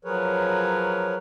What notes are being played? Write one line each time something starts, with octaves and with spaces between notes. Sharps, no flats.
F3 F#3 G#4 A#4 B4 C#5